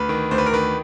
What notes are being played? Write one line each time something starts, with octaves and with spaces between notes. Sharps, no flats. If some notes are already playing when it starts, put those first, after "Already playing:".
Already playing: D2 B4
D#3
D2 C5
B4
A#4
D#3 B4